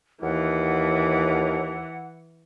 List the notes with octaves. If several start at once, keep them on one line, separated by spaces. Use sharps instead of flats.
D#2 E3 F#5